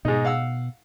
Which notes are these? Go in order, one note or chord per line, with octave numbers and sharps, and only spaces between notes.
G#2 B2 D#4
F5 F#5 E6